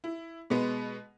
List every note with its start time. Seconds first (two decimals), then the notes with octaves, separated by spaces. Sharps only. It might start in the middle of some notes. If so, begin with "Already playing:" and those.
0.04 E4
0.50 B2 G#3 B3